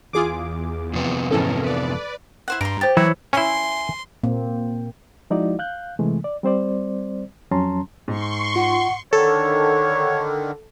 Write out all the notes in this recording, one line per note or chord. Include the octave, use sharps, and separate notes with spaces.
E2 F4 G#4 D6
F2 C3 B3
G#2 E3 C#4 A4 A#4
B4 D5
E4 C5 F#5
G2 A#5 C6 D7
G4 C5 A6
E3 F#3 E4 C#5
C#4 E4 E5 G#5 C6
A#2 A#3 C4
F3 G#3 D#4 E4 F#4 D5
F5 F#6 G6
C3 E3 G#3 A3
D5
G3 C4 C5 D5
F2 F#3 C#4 A5 A#5 C6
G#2 C6 C#6
F4 F#5
D3 D#3 A4 C#5